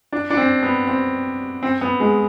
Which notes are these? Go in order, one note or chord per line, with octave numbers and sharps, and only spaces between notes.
D4
D4
C4
B3
C4
C4
B3
G#3